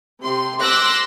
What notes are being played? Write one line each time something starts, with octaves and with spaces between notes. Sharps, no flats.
C3 C6
C6 D6 E6 F#6 A#6 B6